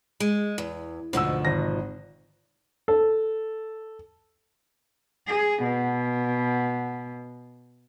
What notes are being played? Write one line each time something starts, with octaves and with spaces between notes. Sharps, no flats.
G#3
E2
D2 G#2 B2 F3 E6
G#1 A#6
A4
G#4
B2